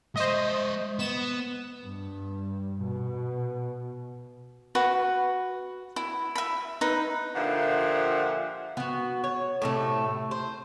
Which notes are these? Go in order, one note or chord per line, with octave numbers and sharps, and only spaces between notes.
G#3 C5 D#5 E5
B3 E7
G2
B2
F#4 B4
E4
E5 B5
D#4 B4
A#2 D3 F3 G4 E5 F#5
B3 F#4
C#5
A2 C3 A3
C5